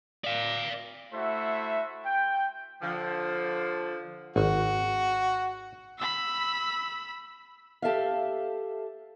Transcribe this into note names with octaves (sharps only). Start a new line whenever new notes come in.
D5 F5
A3 E4 F#4 C5 E5
G5
D3 F3
G#1 F#4
B5 E6
G4 A4 E5 F5